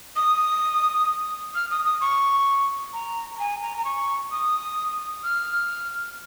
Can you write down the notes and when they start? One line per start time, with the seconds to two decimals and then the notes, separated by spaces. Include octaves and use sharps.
0.16 D#6
1.55 F6
1.70 D#6
1.85 D#6
2.01 C#6
2.93 A#5
3.35 A#5
3.39 G#5
3.62 A#5
3.78 A#5
3.85 C#6
4.31 D#6
5.24 F6